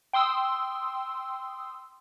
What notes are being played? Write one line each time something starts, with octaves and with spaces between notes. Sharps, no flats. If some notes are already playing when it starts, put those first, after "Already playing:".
G5 C6 D#6 E6